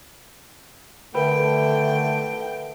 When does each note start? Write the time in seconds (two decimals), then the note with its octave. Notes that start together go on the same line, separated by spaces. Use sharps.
1.15 D3 A3 A#4 B4 G5 B5